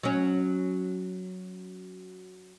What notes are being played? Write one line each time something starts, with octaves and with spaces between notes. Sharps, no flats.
F#3 C#4